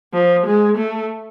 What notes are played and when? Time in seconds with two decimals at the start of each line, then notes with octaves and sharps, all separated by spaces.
0.14 F3
0.46 G#3
0.78 A3